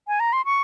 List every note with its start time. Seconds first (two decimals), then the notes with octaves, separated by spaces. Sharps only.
0.08 G#5
0.20 A#5
0.33 C6
0.45 C#6